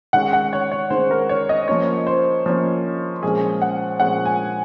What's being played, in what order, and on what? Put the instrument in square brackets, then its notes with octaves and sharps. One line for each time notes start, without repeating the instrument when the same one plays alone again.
[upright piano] D#3 G#3 C#4 F#5
F#5
C#5
C#5
D#3 G#3 C#4 C5
A#4
C#5
D#5
F3 A#3 C#4 C#5
C5
F3 A#3 C#4
A#2 F3 G#3 C#4 G#4
F#5
A#2 F3 G#3 C#4 F#5
G#5